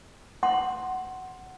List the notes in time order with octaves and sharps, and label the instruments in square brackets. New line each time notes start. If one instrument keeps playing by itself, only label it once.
[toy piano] F#5 C6